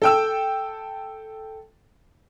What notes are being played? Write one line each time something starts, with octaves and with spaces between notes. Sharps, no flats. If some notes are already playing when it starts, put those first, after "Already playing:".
A4 G5 E6